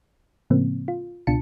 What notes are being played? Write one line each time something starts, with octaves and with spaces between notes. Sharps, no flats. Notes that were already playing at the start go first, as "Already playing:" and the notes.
A2 C#3 F3 A#3 C4
F4
C#2 B2 D4 F4 A5 C#7